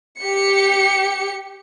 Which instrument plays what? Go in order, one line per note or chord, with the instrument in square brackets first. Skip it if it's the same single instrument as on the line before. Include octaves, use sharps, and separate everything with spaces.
[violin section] G4 C#7